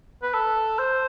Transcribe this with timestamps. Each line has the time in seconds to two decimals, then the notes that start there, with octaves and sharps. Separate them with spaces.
0.22 B4
0.34 A4
0.79 C5